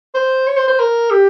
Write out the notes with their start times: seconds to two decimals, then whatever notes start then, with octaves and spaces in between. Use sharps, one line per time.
0.15 C5
0.47 C#5
0.57 C5
0.68 C5
0.79 A#4
1.11 G4